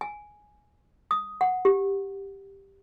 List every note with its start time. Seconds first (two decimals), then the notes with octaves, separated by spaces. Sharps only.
0.01 G#5
1.11 D#6
1.41 F#5
1.65 G4